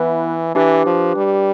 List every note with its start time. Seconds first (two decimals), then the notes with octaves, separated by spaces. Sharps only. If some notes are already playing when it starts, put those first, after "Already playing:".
Already playing: E3 B3 E4 B4 E5
0.55 E3 D4 G4 B4
0.86 F3
1.16 G3